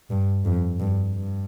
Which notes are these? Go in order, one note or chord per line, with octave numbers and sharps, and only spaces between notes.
G2
F2
G2
G2